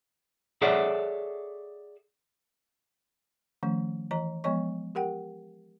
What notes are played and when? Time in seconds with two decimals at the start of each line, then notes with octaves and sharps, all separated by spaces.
0.62 G#4 A4 C#5 D5 E5 F#5
3.63 D#3 F3 A3 C#4
4.11 E3 D#5 A#5
4.44 F3 G#3 B3 C#5 D#5 C#6
4.95 G4 A#4 F#5 G5